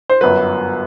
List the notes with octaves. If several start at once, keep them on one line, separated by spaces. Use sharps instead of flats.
C5
G1 F#2 F#3 B4